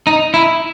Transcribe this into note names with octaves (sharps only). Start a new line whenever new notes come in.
D#4
E4